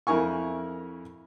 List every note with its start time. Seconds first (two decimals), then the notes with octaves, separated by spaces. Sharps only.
0.07 F2 E4 A#4 G#5 C#6